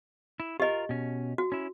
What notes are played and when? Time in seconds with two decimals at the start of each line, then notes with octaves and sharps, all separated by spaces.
0.40 E4
0.60 F4 G4 A#4 D#5
0.89 B2 C#4
1.38 F#4
1.52 C#4 E4